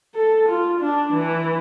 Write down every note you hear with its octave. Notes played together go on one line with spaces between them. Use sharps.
A4
F4
D4
E3